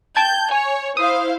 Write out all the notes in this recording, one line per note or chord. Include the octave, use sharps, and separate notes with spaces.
G5 A5 G6 G#6
C#5 G#5
E4 C5 F5 D#6